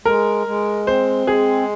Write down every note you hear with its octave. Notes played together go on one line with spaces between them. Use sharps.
G#3 A#4
G#3
C4 C5
G#3 G#4